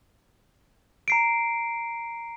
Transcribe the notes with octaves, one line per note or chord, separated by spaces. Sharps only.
A#5 C7 D7